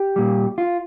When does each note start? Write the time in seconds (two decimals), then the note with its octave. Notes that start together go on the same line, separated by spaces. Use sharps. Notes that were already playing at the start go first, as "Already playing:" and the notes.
Already playing: G4
0.16 A#2 G3
0.58 F4